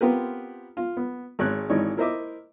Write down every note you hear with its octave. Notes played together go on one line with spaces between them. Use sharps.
B3 C4 F4 G4 A#4 B4
F4
B3
G#1 G#3 C#5 F#6
G#1 E3 D#4 C#5 D5
E4 A#4 C5 D#5 E5 D6